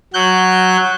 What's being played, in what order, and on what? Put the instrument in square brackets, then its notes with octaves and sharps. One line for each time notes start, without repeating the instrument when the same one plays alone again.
[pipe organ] F#3 F#6 G6